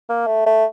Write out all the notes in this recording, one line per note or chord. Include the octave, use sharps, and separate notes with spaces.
A#3
A3
A3